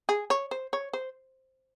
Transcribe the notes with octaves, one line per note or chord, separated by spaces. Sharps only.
G#4
C#5
C5
C#5
C5